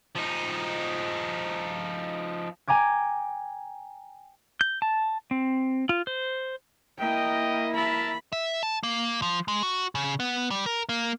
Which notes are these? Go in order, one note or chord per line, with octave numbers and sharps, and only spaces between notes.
F3 D#4
G5 G#5 A#5 D6 G#6
G6
A5
C4
F4
C5
A#3 E4 A#4 D#5 G5
A#4 E5 A5 B5
E5
A5
A#3
F3
G#3
F#4
C#3
B3
G3
A#4
A#3